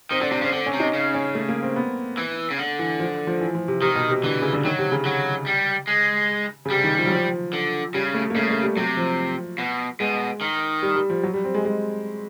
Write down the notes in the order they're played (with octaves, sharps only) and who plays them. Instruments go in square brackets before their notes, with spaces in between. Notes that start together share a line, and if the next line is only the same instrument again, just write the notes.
[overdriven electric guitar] D#3 [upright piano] C4
[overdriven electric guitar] D3 [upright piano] D4
[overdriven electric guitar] C3 [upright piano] D4
[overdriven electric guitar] C#3 [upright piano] C4
[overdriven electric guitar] D3 [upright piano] C4
[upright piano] C#4
[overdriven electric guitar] C3
[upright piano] D#4
[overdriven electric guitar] C#3
[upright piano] C#4
A3
A#3
C4
B3
[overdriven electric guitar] E3
C#3
D3
[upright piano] E3
F3
F3
E3
F3
C3
[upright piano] C3 [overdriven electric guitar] D#3
[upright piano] B2
C3
[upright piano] D3 [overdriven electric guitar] E3
[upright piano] C#3
D3
[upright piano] D#3 [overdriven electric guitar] F#3
[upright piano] C3
C#3
[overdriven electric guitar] F#3
G3
G#3
[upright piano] C#3
[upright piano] C3 [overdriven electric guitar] G3
[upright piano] D#3
F3
F#3
F3
[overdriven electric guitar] D3
[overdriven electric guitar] C#3 [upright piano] G3
[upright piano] A3
A#3
[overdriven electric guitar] C#3 [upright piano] A3
[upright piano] A3
G3
[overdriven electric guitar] C3 [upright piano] F#3
[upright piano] F3
[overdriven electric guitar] B2
[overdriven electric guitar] B2 [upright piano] G#3
[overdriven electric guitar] D#3
[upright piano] G3
G3
F3
F#3
G3
C4
G#3
G#3